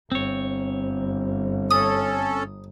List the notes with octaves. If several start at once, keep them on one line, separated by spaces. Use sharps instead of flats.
G1 C4 C#5
C#4 A4 D#6